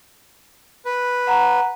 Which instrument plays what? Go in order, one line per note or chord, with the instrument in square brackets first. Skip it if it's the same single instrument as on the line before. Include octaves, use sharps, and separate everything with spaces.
[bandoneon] B4
[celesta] F#5 A#5